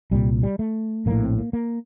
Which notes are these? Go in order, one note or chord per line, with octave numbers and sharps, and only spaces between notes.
C2 A#2 G3
G3
A3
A#1 A2 A#3
C4
A#3
A#3